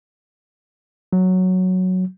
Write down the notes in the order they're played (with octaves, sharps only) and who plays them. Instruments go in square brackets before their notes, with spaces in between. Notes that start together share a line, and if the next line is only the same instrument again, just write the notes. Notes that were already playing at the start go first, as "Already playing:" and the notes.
[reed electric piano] F#3